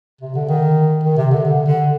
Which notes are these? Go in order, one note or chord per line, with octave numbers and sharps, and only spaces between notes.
C3
D3
D#3
D#3
C3
D3
D3
D3